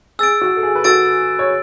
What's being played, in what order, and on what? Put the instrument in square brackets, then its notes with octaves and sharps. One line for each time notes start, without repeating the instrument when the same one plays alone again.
[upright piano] G#4 [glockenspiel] E6 A6 D7
[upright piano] F#4
A4
G#4
B4
[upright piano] F#4 A4 [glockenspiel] E6 A6 D7
[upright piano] C#5